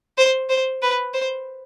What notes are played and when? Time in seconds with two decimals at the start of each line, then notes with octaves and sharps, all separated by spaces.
0.18 C5
0.50 C5
0.82 B4
1.14 C5